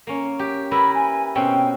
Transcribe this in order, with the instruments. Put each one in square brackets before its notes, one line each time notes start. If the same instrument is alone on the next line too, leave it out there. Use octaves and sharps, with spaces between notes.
[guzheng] A#3 C#4
G4
[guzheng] E4 A#4 B4 [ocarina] B5
[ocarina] G#5
[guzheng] B2 C4 C#4 [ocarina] G5